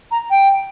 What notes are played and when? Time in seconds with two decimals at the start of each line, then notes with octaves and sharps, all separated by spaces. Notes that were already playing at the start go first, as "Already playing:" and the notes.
0.11 A#5
0.30 G5